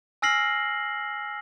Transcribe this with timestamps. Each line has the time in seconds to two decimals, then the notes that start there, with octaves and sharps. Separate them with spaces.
0.22 G#5 E6 F6 A#6 C7 F#7